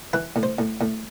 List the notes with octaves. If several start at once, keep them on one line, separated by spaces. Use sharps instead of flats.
E3 B4
A2
C5
A2
A2